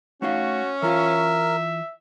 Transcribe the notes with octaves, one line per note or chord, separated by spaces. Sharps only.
A3 C#4 D#4 F#4 F5
E3 F4 A#4 E5 F5